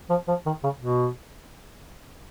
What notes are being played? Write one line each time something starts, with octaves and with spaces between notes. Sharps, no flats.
F3
F3
D#3
C#3
B2